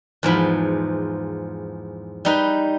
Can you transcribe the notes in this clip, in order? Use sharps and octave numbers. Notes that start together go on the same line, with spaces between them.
E2 G#2 F3 B5
G3 D#4 B4